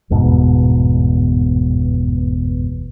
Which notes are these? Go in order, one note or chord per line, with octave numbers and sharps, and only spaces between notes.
G1 E2 G#2 B2